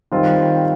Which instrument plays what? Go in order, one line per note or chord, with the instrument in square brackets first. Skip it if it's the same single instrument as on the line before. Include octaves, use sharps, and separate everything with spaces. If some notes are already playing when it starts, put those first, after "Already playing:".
[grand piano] D#3 G3 C4 F4 C5